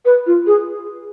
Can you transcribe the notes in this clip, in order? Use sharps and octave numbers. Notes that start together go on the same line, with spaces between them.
B4
F4
G#4